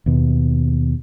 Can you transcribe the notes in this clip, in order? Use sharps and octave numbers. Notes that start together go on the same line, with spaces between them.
D#2 B2